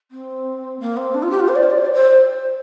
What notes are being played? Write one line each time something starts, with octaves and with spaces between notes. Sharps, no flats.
C4
A#3
C4
D4
F4
G4
F4
C5
D5
C5
D5
C5
D5
C5